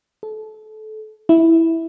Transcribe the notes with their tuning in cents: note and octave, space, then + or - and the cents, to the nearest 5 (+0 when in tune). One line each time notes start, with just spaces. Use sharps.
A4 -25
E4 -5